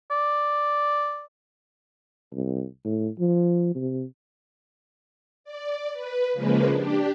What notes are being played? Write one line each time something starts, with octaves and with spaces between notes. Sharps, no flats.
D5
C2
A2
F3
C3
D5
B4
C#3 F3 G#3 A#3 B4
D4 G4